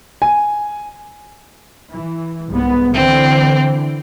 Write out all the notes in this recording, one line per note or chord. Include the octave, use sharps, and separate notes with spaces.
G#5
E3
C2 G#2 B3
D3 E3 C4